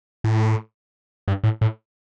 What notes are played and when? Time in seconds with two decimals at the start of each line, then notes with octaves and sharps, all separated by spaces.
0.24 A2
1.28 G2
1.44 A2
1.61 A2